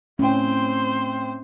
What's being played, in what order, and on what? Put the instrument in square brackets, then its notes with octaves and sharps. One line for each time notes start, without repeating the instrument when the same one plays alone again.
[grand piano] A2 G5 [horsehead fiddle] C4 C5 [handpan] C#4